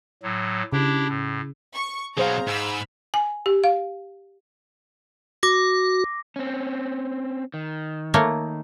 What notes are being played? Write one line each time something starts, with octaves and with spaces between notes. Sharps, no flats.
A2 F#3
C#3 D4 E4 G4
A2
C#6
B2 F#3 G#4 C5 F5 A#5
G#2 B5 E6 F6
G#5
G4
F5
F#4 D6 A#6
C4 C#4
D#3
A3 A#3 C#5